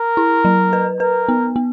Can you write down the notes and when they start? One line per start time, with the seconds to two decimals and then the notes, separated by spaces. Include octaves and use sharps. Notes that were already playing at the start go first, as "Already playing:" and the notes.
Already playing: A#4
0.17 E4
0.45 F#3
0.73 B4
1.00 A#4 B4
1.29 B3
1.56 B3